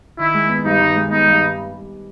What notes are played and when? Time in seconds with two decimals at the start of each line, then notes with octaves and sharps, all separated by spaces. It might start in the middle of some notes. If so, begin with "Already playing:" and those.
0.19 D#3 E4
0.34 G#3
0.49 B3
0.64 G2 D#4
0.81 D#3
0.95 G#3
1.11 B3 D#4
1.26 G2